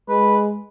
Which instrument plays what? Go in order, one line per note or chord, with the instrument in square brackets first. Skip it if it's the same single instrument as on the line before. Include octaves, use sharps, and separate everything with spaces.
[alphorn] G#3 [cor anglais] B4